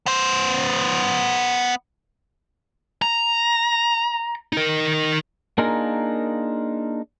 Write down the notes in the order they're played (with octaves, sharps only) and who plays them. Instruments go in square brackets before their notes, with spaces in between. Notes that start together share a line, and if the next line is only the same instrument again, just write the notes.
[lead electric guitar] B3 C5
A#5
D#4 A#4
[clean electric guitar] A#3 D4 D#4 F4 G#4 A#4